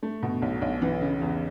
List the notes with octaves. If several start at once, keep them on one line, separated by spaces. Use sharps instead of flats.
A3
B2
B1
B1
E3
C#3
E2